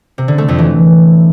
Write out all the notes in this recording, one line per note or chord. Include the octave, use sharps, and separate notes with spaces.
C3
D3
A3
F2
E3